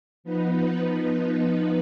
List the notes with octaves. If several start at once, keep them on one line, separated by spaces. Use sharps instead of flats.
F3 B3 D#4 B4